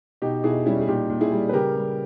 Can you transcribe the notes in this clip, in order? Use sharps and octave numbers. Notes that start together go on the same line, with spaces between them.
B2 D#4 G4
B2 E4 G#4
G3 C#4 E4
G#4
A#2 D#4 G4
A#2
E4 G#4
G3
B4
C#3 G4 A#4
G3